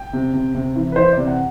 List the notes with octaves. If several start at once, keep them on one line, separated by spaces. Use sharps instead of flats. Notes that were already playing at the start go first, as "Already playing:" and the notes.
Already playing: G5
C3
C3
C3
E3
B4
E3 C5
C3 D5
F#5